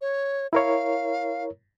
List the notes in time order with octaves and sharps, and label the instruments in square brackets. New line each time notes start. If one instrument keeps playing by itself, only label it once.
[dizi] C#5
[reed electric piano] E4 A#4 C#5 [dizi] F5